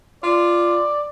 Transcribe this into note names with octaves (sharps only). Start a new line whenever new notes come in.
F4 D5